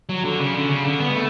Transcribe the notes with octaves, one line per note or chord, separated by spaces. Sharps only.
F#3
D3
C#3
D3
C#3
D3
B3
G#3
A3